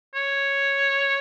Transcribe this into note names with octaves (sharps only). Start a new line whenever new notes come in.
C#5